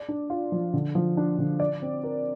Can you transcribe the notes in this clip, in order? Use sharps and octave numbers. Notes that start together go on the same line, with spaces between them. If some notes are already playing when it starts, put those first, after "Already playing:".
Already playing: D5
D4
F4
F3
D3
F3
D4
D3
D5
C4
A#4